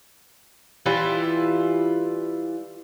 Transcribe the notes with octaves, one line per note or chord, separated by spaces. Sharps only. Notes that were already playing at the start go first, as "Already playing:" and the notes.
E3 G3 E4 F4